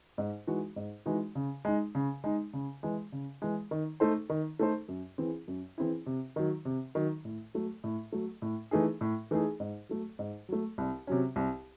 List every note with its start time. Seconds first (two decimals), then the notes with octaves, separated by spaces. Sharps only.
0.18 G#2
0.47 E3 G#3 D#4 F#4
0.76 G#2
1.06 E3 G#3 D#4 F#4
1.35 C#3
1.65 G#3 D#4
1.95 C#3
2.24 G#3 D#4
2.53 C#3
2.83 E3 G#3
3.12 C#3
3.42 E3 G#3
3.71 D#3
4.00 A3 D#4 A4 C5
4.29 D#3
4.59 A3 D#4 A4 C5
4.88 F#2
5.18 E3 C4 E4 G#4
5.48 F#2
5.77 E3 C4 E4 G#4
6.06 C3
6.36 D#3 F#3
6.65 C3
6.95 D#3 F#3
7.25 A2
7.54 F#3 A3
7.84 A2
8.12 F#3 A3
8.42 A2
8.71 E3 A3 D#4 G#4
9.01 A2
9.31 E3 A3 D#4 G#4
9.60 G#2
9.89 F#3 A3
10.19 G#2
10.49 F#3 A3
10.78 C2
11.07 C3 F#3 C#4
11.36 C2